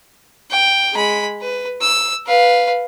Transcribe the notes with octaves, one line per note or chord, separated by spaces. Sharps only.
G5
G#3 B5
B4
E6
B4 F5